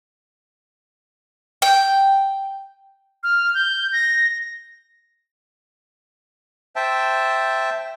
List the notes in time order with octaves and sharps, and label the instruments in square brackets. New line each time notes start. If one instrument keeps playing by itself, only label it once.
[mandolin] G5
[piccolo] F6
G6
A#6
[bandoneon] C5 E5 G5 A5